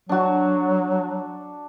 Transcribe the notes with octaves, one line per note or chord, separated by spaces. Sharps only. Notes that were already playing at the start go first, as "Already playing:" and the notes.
F#3 D4 F#4